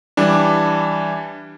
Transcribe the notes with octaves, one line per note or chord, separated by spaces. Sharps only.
E3 G3 D4